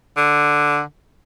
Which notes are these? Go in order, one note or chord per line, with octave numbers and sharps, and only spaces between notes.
D3